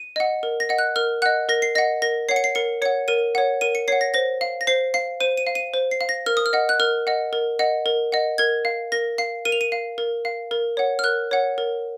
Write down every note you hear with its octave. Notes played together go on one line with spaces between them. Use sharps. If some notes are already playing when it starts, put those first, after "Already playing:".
Already playing: D#7
D#5 F#5
A#4
A#6
D#5 F#5
F#6
A#4 F6
D#5 F#5 F#6
A#4 A#6
C7
D#5 F#5 A#6
A#4 A#6
C#5 F#5 C7
C#7
C7
A#4 C#7
C#5 F#5 C#7
A#4 D#7
C#5 F#5
A#4 D#7
C#7
C#5 F#5 C7
A#6
C5 A#6
F5
A#6
C5 C7
F5 C7
C5 D#7
D#7
F5
D#7
C5
C7
F5
A#6
A#4 F6
D#6
F6
D#5 F#5
F#6
A#4 F6
D#5 F#5
A#4
D#5 F#5
A#4
D#5 F#5
A#4 G#6
F5
A#4 A#6
F5 C7
A#4 D#7
F7
D#7
F5
A#4
F5
A#4
C#5 F#5
F6
A#4 F#6
C#5 F#5
A#4